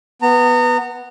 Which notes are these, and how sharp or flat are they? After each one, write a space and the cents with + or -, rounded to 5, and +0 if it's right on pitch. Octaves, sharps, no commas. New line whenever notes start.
B3 +0 A#5 -35